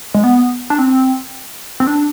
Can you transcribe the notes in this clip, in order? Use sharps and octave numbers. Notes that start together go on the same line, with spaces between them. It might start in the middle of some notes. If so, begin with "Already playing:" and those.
G#3
B3
D4
C4
C4
D4